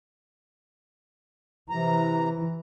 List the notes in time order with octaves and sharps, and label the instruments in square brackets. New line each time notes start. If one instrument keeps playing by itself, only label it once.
[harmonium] C3 A#5 [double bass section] E3